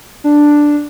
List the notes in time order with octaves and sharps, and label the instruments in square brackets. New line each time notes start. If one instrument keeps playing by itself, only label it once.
[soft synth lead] D4